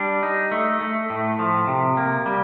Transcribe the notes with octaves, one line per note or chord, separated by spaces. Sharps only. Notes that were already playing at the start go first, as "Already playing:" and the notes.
Already playing: G3 D4
D#4
A3
A3
A2
F3
C3
A#3
G3